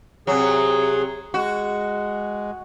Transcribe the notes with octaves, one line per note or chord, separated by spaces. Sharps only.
C3 F#3 G#4
G#3 F#4